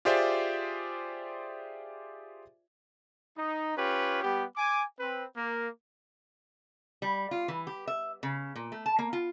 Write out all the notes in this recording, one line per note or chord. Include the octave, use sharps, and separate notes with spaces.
F4 G4 G#4 C5 D5 E5
D#4
C#4 F4 G4 B4
G3 B3 G4
G#5 D6
C4 B4
A#3
G3
F4
E3
G4
E5
C#3
A#2
A3
A5
A#3
F4